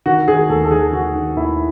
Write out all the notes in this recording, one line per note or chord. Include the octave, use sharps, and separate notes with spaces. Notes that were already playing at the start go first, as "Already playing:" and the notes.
D#3 F#4
D#3 G#4
D#2 A4
A4
D#3 G#4
D#3 F#4
D#3
D#2 E4